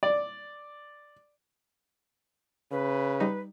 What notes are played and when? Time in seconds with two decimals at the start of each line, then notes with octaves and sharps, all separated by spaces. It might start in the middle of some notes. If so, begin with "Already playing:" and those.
0.03 D5
2.71 C#3 B4
3.20 G3 D#4